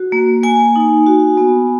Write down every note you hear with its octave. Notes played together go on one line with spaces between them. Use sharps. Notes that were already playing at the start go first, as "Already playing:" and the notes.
Already playing: F#4
A#3
A#3 G#5
D#4
F#4
B3